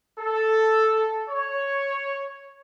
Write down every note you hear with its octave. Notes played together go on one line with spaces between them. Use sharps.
A4
C#5